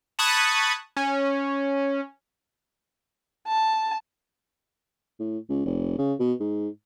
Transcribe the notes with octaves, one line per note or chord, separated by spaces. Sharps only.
A5 B5 C#6 D#6 F#6 G#6
C#4
A5
A2
C#2
F1
C#3
B2
G#2